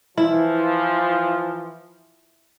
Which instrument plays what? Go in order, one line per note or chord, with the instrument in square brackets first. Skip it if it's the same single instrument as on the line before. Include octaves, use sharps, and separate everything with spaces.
[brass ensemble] E3 F3 [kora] E4